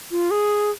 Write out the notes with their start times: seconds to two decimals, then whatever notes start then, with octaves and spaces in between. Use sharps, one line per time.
0.11 F4
0.31 G#4